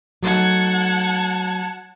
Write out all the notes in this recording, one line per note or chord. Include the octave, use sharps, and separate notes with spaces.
F#3 A3 D#4 F#5 A5 G#6